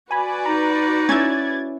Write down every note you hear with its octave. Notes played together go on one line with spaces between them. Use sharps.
F#4 B4 D5 G#5 B5
D#4 A#5
C#4 E4 G#6 A6